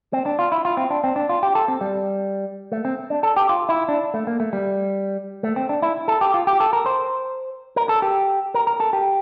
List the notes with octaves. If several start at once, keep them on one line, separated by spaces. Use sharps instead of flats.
C4
D4
F4
E4
F4
C4
D4
C4
D4
F4
G4
A4
C4
G3
A3
C4
D4
A4
G4
F4
E4
D4
A3
A#3
A3
G3
A3
C4
D4
E4
A4
G4
F4
G4
A4
A#4
C5
A#4
A4
G4
A#4
A#4
A4
G4